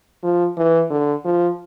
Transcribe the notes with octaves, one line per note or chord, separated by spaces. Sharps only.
F3
E3
D3
F3